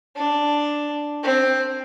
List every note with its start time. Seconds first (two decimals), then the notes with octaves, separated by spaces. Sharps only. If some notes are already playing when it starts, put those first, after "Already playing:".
0.16 D4
1.23 C4